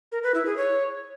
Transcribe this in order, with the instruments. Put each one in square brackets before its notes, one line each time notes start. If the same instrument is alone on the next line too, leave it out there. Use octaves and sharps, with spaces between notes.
[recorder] A#4
B4
E4
G#4
C#5